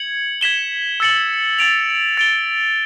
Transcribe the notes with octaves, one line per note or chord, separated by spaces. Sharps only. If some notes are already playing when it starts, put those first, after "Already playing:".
Already playing: G#6 C#7 F#7
G#6 B6 E7 G7
E6 A6 C#7 F#7
A6 D7 F7
A6 D7 G7